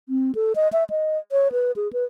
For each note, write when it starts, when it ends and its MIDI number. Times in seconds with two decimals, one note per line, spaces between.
0.09 0.32 60
0.35 0.53 69
0.55 0.68 75
0.73 0.84 76
0.90 1.18 75
1.32 1.52 73
1.52 1.72 71
1.76 1.91 68
1.93 2.04 71